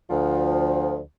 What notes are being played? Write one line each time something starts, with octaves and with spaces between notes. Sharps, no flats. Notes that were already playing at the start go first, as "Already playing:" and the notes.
D2 F3